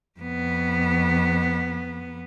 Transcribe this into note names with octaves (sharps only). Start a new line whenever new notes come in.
F2 B3